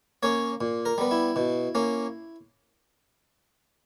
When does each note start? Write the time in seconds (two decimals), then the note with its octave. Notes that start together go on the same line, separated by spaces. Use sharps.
0.23 A#3 C#4 C#5
0.61 A#2
0.85 A#4
0.98 G3 B3
1.11 E4
1.36 B2
1.75 A#3 C#4